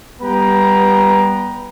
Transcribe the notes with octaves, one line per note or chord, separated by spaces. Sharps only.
G3 B3 B4 G5 A#5